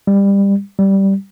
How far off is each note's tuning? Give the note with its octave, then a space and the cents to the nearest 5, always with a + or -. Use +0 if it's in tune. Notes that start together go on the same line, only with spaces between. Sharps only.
G3 +20
G3 -10